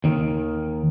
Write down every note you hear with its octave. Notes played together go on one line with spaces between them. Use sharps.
D#2 D#3